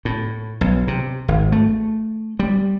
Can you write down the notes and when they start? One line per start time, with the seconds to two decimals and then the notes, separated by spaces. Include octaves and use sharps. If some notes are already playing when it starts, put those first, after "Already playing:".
0.05 A2
0.61 B1
0.88 C3
1.28 G#1
1.52 A3
2.39 G3